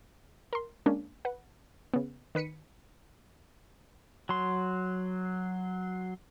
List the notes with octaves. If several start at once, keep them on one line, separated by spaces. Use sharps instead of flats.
A#4 C6
G#3 A#3 C#4 D4
B4 F#5
C#3 B3
D#3 B4 B6 C#7 D#7
F#3 C6